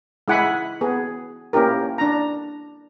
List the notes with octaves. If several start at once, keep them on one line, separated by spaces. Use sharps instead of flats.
G#3 E4 F#5 G#5 B5
B3 G#4
A#3 C#4 E4 G4 A#4
D4 A#5